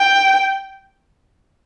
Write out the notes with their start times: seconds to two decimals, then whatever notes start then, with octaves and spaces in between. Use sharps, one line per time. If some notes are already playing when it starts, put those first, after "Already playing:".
Already playing: G5